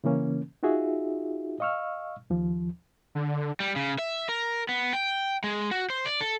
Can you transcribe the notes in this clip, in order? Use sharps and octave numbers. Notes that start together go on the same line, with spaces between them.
C#3 E3 A#3 C#4
D#4 F4 F#4 G#4 E5
D#5 F5 C#6 E6 F6
D#2 F3
D3
G3
C#3
E5
A#4
B3
G5
G#3
F#4
C5
D5
A4